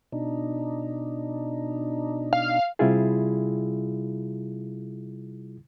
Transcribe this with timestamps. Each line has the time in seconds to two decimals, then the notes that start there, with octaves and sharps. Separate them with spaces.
0.12 B2 D4 D#4
2.33 F5
2.79 C3 G3 E4 F4 G#4